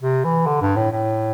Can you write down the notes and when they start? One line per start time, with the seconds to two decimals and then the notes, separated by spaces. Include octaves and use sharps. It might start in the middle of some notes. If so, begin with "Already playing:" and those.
0.02 C3
0.25 E3
0.47 D3
0.61 G2
0.77 A2
0.91 A2